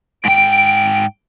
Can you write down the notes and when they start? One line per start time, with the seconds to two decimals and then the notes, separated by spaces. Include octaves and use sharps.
0.25 G#2 G5 D7